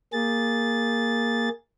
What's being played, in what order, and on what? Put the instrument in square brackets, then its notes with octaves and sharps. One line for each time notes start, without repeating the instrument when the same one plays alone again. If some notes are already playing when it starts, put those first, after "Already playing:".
[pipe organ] A#3 G#4 A6